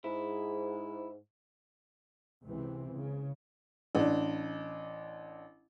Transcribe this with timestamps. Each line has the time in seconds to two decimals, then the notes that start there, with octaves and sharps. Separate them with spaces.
0.04 G#2 E4
2.44 C#2 C3 E3 C4
2.95 C#3
3.95 A1 D4